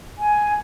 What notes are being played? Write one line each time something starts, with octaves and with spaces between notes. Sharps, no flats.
G#5